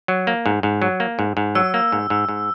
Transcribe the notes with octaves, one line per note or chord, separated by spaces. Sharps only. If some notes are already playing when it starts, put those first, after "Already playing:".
F#3
A#3
G#2
G#2
F#3
A#3
G#2
G#2
F#3 E6
A#3
G#2
G#2
G#2